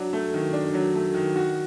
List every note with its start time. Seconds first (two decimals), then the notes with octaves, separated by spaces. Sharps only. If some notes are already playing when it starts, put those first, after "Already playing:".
Already playing: F#3 D4
0.13 A3
0.34 D#3
0.53 D4
0.74 F#3
0.95 A3
1.14 D#3
1.36 F#4